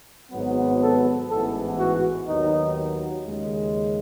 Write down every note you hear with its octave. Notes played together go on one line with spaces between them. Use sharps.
G#1 G#2 F#3 B3
A4
A1 G#2 E3 B3 A4
F#4
D#2 D#3 F#3 B3 D#4
D#2 C#3 G#3